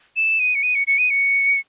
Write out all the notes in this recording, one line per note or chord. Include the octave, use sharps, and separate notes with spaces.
E7
D#7
C#7
D#7
C#7
C#7
D#7
C#7